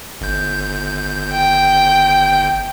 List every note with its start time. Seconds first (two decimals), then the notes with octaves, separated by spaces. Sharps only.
0.21 G1 G6
1.33 G5